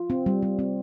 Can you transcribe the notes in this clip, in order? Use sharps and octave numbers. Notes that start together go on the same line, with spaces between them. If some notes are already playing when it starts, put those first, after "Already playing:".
Already playing: F4
C4
G3
G3
C4